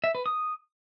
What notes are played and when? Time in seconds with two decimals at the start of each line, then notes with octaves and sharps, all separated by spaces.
0.04 E5
0.15 B4
0.26 D#6